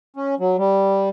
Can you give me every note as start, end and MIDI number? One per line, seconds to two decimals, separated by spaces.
0.17 0.35 61
0.40 0.56 54
0.58 1.09 55